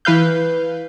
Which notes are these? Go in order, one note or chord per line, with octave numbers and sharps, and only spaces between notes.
E3 B4 F5 G6